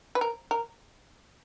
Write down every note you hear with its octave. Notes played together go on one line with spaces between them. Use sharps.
B4
A#4
A#4